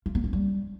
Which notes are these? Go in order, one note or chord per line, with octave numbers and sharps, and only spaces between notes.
F4
B3
C#4
G3